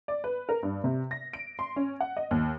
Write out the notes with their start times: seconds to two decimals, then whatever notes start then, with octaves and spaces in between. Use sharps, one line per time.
0.08 D5
0.24 B4
0.49 A#4
0.63 G2
0.84 C3
1.11 A#6
1.33 D7
1.59 C6
1.76 C#4
2.00 F#5
2.17 D#5
2.31 D#2